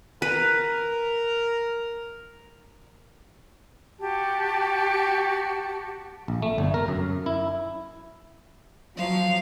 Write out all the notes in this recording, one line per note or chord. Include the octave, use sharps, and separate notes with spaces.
A#4 B4
F#4 G4 A5
A#1
A3
G1
A#4
F#2
E4
F3 F#3 F5